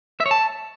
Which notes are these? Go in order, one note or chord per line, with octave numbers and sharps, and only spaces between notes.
E5
C#5
A5